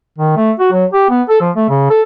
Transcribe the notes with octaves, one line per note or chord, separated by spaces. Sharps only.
D#3
A3
F#4
F#3
G4
B3
A4
F3
A3
C#3
A4